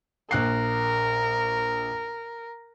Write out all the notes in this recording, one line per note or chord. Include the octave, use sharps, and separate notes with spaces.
A#1 A#4 F#6 C7